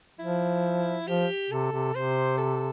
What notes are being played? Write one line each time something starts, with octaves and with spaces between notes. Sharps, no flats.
F3 E4
F3 G4
C3 A4
C3
C3 C5
A4